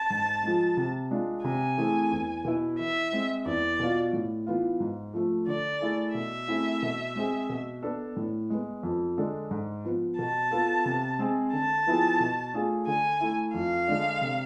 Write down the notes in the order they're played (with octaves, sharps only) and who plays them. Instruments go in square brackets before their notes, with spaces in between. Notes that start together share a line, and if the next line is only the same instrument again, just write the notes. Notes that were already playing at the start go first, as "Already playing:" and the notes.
Already playing: [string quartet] A5
[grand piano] G#2
F3 G#3
C3
G#3 D4 F4
[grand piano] C3 [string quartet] G#5
[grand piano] E3 A3 C4 G#4
E2
B2 B3 E4
[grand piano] E3 [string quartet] E5
[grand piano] G#3 C4
[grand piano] E2 [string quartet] D5
[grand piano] B2 B3 F4
A2
E3 B3 F4
G#2
F3 A3
[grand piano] D3 [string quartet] D5
[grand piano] A3 E4 G#4
[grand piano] B2 [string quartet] E5
[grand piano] A3 C4 E4 G#4
B2
G#3 C4 G#4
B2
B3 D4 A4
A2
G#3 B3
F2
D3 G#3 D4 A4
G#2
F3 B3
[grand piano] B2 [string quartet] A5
[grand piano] B3 F4 A4
C3
G#3 C4 G#4
[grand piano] D3 [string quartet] A5
[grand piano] F3 B3 E4 G#4
B2
A3 D4 F4 G#4
[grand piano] D3 [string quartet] G#5
[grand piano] A3 E4
[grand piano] F2 [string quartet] F5
[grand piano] D3 G#3 D4
C3